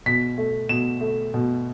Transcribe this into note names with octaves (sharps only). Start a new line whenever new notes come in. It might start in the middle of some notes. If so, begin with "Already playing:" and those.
B2 B6
A3
B2 E7
A3
B2